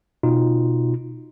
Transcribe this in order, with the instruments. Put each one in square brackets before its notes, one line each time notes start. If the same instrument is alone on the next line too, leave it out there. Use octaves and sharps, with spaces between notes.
[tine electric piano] B2 D#4 F4